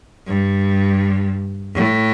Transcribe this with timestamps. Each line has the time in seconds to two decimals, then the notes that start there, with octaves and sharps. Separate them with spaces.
0.26 G2
1.75 A2